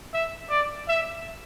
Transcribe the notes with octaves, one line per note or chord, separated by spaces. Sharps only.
E5
D5
E5